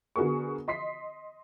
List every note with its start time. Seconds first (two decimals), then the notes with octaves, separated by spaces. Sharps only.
0.16 D3 B3 F#4 G#4 A#4 C#6
0.68 D#5 C6 B6 C7